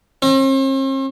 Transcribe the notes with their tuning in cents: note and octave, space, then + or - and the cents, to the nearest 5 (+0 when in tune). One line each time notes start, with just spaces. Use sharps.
C4 +45